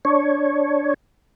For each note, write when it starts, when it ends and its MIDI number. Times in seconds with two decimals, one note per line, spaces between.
0.05 0.94 62
0.05 0.94 73